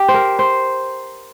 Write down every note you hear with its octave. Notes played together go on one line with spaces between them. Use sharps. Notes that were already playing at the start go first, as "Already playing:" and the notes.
Already playing: G4
C5
A#4
C5